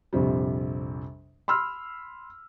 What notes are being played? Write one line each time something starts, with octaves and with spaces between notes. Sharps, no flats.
A#1 F2 C3 G3
B5 C6 E6 F6